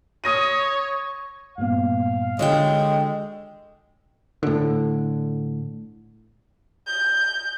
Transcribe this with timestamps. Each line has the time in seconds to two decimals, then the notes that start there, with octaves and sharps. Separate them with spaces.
0.24 C#5 D#6 A#6 D#7
1.58 G2 A#2 B3 F5
2.39 D3 G#3 F#4 C#5 G5
4.43 A2 D3
6.87 G6